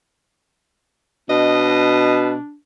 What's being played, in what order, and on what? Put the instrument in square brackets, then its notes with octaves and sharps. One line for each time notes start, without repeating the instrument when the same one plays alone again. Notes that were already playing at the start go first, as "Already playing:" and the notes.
[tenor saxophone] B2 [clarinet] D4 [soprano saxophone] D#5